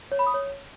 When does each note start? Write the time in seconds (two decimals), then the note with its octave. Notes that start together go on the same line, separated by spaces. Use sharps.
0.12 C#5
0.19 B5
0.27 D#6
0.34 C#5